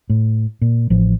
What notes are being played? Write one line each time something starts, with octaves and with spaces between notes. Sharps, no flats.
A2
A#2
A1 F3